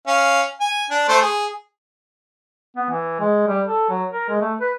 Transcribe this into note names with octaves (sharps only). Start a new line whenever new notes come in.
C#4 F5
G#5
D4
A3 C5
G#4
B3
E3
G#3
G3
A4
F#3
A#4
G#3
A3
B4